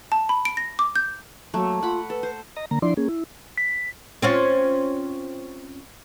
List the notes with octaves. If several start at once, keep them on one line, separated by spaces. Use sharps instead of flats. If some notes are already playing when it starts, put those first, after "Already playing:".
A5
B5
D7
A#6
D6
G6
F#3 A3 A#3
F4 F#5 B5
A4 B4
C5
D#5 A#5
D3 A#3 A#5
F3 D4 E4 D5 C6
A#3 C#4 G#4
E4
B6
C4 C#4 F4